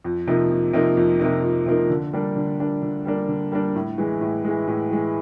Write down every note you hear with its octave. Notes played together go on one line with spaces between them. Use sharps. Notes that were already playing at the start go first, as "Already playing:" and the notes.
F2
C3 F3 A#3 D#4
F2
C3 F3 A#3 D#4
F2
C3 F3 A#3 D#4
F2
C3 F3 A#3 D#4
D3
G3 A#3 D4
D3
G3 A#3 D4
D3
G3 A#3 D4
D3
G3 A#3 D4
A2
E3 G#3
A2
E3 G#3
A2
E3 G#3